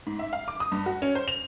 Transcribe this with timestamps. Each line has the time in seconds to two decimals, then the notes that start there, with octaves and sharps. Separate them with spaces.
0.07 G#2
0.19 E5
0.33 F5
0.48 D6
0.60 D#6
0.72 G2
0.86 F#4
1.02 C#4
1.15 C5
1.28 F7